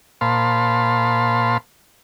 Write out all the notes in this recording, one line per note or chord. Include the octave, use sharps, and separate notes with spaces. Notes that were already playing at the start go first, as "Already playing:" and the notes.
A#2 C5 F5 A5 B5 C6